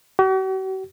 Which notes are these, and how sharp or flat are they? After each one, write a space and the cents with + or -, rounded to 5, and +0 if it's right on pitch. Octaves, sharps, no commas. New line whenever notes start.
F#4 +45